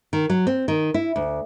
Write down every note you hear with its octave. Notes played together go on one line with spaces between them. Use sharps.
D#3
F#3
C4
D#3
E4
D2